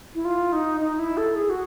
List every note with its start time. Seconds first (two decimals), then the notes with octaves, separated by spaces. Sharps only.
0.15 E4
0.25 F4
0.52 D#4
0.80 D#4
0.99 E4
1.17 A4
1.36 G#4
1.50 F#4